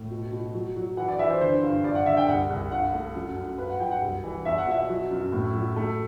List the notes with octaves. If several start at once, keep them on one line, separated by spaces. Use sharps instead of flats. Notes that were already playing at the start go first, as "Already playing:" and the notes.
Already playing: A2
B2
B2
F#3
F#3
E3 F#5
D5
E3 E5
C5
D3 C5
G2
G2 D5
F#5
D3 E5
G5
C2 F#5
C2
G2 F#5
A3
F#2
F#2
G2 B4
F#5
F#3 G5
F#5
C2
E3
E2 E5
F#5
B2 E5
F#3
F#2
A2
F#3
A3